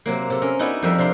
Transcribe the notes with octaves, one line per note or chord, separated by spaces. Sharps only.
C3 F#3 A#3
C3 A4
C#4 A#4
B3 D#4 E4 F#4 D5
F2 F3 G3 A#4 E5
C3 D4 F5 C6